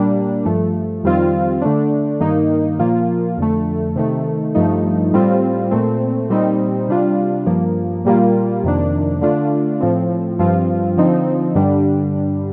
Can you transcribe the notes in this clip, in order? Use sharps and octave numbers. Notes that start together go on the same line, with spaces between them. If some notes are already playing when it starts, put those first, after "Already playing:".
Already playing: A#2 G3 A#3 D4
G2 F3 A3
F2 D#3 G3 C4 F4
D3 A3 D4
G2 D#3 A#3 D#4
A#2 F3 A#3 F4
F2 D3 A3
C3 D#3 A3
G2 F3 A3 D#4
A2 G3 C4 F4
A#2 A3 C4
A#2 G3 C4 D#4
C3 G3 D4 F4
G2 F3 A#3
A#2 G3 A#3 F4
F2 C3 D#3 A#3 D4
D3 A3 D4 F4
A2 F3 C4
G2 F3 C4 F4
D3 F3 C4 D#4
G2 D3 G3 D4